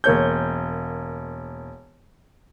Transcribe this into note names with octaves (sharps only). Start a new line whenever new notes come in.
E1 A#3 C#5 G6